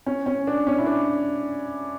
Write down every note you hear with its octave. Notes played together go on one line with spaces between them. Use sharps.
C#4
C#4
D4
C#4
E4
D4